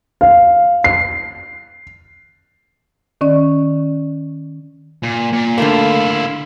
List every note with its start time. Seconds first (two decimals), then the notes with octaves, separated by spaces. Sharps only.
0.21 F5
0.84 C7
3.21 D#3 C#4 D5
5.03 A#2
5.33 A#2
5.58 D3 A3 A#3 E4 F4